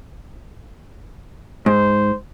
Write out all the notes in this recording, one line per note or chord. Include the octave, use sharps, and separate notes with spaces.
G#2 C5